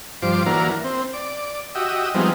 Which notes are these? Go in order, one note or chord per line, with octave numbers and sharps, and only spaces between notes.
G2 F3 C5 D6
E3 F#3 A#3 D4 A#4
C4
D5
F#4 G4 D#5 E5
F3 G3 G#3 B3 C4 D#4